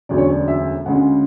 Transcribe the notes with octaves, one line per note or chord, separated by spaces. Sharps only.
E1 D2 C#3 F#3 D5
C#5
D5
E5
D2 C#3 G#3 C#4 F#5